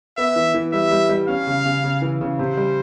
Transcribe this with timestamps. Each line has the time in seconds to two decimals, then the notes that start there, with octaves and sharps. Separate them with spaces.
0.18 B3 E5
0.36 E3
0.54 E3
0.73 G3 E5
0.91 G3
1.09 G3
1.28 C#4 F5
1.47 C#3
1.66 C#3
1.84 C#3
2.02 E3
2.21 C#3
2.39 C3 C5
2.57 G3